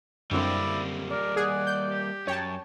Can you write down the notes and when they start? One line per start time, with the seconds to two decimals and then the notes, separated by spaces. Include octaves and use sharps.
0.31 F#2 D3 G3 A#3 C4 E4 D5
1.11 A#4 D5
1.36 G#4 F#5
1.66 G6
1.89 G4
2.27 F#2 C#5 G5 A5